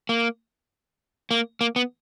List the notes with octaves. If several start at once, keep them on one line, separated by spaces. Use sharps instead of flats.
A#3
A#3
A#3
B3